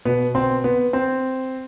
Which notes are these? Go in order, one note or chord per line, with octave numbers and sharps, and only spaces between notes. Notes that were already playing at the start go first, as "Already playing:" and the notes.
B2 B3
C4
B3
C4